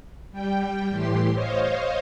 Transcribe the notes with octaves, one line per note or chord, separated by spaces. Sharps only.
G3 G5
A2 E3 G4 C6
C5 C#5 D#5 F5